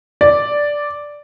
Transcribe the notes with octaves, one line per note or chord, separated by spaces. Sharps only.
D5